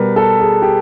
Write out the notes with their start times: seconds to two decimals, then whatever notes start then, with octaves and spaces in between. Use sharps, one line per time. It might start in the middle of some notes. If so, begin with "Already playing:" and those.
Already playing: B2 G3 A#4 B4
0.16 A4
0.40 G#4
0.62 G4